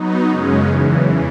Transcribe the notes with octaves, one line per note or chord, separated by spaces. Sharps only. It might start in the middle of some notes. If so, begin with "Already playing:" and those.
Already playing: F#3 B3 D#4
F#2 C#3 G#3 C#4
E2 C#3 E3